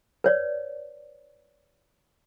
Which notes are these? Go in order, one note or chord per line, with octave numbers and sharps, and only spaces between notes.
B4 C#5 D5